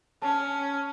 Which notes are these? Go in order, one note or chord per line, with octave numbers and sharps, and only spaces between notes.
C#4 A5